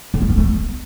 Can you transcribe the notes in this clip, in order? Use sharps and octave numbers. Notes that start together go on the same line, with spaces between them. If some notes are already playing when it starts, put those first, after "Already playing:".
D3
G3
B3
A3
B3